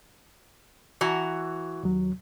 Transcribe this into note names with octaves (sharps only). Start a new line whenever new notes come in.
E3 F#4 A#5
D#2 F#3